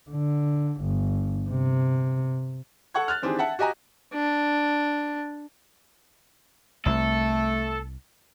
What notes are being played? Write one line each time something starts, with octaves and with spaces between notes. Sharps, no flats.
D3
G1
C3
A4 F#5 C#6 G#6
F6 F#6 A6
D#3 E3 C4 D4 G4 G#4
E5 F#5 A5
F#4 G4 D#5 G#5 A#5
D4
C2 A3 A4